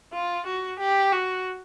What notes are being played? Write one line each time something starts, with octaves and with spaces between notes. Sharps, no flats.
F4
F#4
G4
F#4